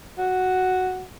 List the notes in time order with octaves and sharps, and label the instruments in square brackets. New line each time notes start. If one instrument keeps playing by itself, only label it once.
[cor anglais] F#4